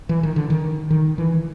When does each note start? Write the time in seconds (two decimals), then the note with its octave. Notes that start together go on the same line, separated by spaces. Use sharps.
0.09 E3
0.23 D#3
0.36 D3
0.50 D#3
0.90 D#3
1.18 E3